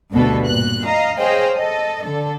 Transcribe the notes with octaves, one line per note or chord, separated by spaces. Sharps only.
D2 G2 B2 B3 A4
A#2 F#6
D#5 F5 A#5
G#4 C5 C#5 D#5 F5 G5
A4 D#5
D3 A4